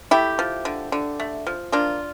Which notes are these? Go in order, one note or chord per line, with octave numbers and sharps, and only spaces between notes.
A3 E4 G4
F3
D3
D3
A3
F3
A#3 D4 F4